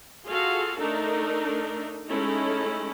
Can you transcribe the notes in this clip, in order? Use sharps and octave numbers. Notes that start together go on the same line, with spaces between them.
F4 F#4 G#4 A4 F5
A3 D4 D#4 A4 A#4
G#3 A3 C#4 D#4 E4 A4